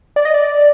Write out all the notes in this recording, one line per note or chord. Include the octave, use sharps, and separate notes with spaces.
D5
D#5
D5